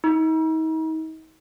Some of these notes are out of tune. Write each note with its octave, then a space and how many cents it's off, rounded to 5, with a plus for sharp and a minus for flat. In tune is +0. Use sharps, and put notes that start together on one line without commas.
D#4 +40